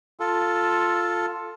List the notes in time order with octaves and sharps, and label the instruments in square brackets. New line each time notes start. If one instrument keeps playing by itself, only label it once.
[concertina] F4 A4